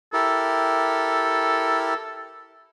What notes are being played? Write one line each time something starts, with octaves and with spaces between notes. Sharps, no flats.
E4 G4 A4 A#4